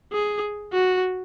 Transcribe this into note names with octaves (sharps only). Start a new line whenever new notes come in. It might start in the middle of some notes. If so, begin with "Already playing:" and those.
G#4
F#4